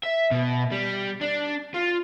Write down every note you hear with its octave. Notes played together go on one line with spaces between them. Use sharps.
E5
B2
G3
D4
F4